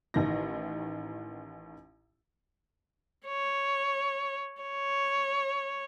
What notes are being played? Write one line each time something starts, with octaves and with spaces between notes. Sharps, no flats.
A1 D#3 E4 A#6
C#5
C#5